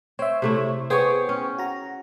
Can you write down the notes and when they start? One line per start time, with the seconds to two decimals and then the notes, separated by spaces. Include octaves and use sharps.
0.19 C4 C#5 E5
0.42 C3 A3 E4
0.90 B3 G#4 C5 C#5 G5
1.29 C#4
1.58 F#4 A#5